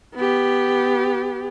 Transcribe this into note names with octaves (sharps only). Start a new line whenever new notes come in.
B3 G4